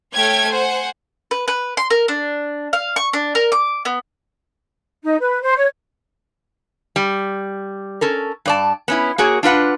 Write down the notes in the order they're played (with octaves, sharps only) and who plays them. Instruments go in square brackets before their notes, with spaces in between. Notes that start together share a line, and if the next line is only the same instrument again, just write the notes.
[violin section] A3 C#5 E5 G5 F6 G#6
C5 F#5 G#5
[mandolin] B4
B4
C6
A#4
D4
F5
C#6
D4
A#4
D6
B3
[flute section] D#4
B4
C5
C#5
[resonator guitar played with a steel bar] G3
C#4 A4 A#4
G2 D5 A5
B3 C#4 E4
A#3 F#4 G#4 C#5
D4 F4 B4 F#5